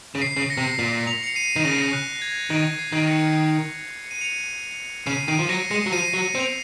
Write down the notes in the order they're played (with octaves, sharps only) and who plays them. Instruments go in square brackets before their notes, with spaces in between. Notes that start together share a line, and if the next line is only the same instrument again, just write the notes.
[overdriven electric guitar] C#3
[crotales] C7
[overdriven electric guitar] C#3
[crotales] A#6 C#7
[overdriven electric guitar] C3
A#2
[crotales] F7
C#7 F7
C7 D#7
[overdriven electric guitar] D#3
[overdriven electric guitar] C#3 [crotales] A#6
[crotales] C7
A#6
F#6
G#6
[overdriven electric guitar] D#3 [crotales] A#6
[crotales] C7
[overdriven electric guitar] D#3
[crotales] A#6 C#7
C#7
D#7
C#7 F7
[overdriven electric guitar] C#3 [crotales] C7 D#7
[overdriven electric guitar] D#3 [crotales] C7 D#7
[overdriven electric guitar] F3
[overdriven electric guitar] F#3 [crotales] A#6 C#7
[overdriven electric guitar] G#3 [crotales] A#6 C#7
[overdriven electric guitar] F#3
[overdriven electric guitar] F3 [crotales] C7 D#7
[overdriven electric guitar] F#3
C4
[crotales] F7